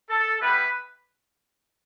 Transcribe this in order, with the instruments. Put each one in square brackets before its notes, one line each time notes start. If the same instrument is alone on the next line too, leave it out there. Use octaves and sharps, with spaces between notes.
[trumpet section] A4
G3 B3 E4 G4 B4